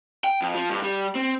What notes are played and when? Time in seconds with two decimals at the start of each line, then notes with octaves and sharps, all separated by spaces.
0.24 G5
0.42 F2
0.55 F3
0.70 G2
0.83 G3
1.15 C4